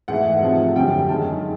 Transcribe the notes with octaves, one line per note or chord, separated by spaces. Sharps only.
G#2 E3 A3 F#5
C3 F3 A3
F#2 D3 G3 G5
F#2 D#3 G#3 A5